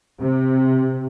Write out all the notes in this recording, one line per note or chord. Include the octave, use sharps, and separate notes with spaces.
C3